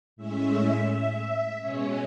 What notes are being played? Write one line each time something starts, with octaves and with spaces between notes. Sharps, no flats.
A2 G#3 C#4 E5
E5
B2 G#3 C#4 C#5